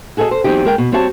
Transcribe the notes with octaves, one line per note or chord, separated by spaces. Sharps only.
F#4 G#4 A4 C5 D#5
C5
E2 D#3 F#3 C4 D#4 G4
G#3 A#4 G5
B2
G3 C4 F#4 C#5 F5 A5